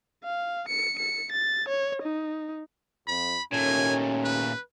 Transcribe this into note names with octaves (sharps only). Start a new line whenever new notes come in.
F5
C#7
C#7
A6
C#5
D#4
F2 B5
D#2 A#2 A3 C#4 G#5
B4